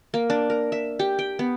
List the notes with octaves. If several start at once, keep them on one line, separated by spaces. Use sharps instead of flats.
A#3
D4
A#4
E5
G4
G5
B3